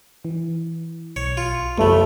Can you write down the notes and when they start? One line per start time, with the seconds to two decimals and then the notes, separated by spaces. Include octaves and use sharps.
0.25 E3
1.16 B1 C#5
1.37 F4
1.78 A1 F#2 C#3 F3 A3